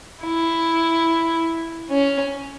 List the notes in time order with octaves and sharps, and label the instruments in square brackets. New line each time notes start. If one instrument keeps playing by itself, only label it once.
[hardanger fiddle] E4
C#4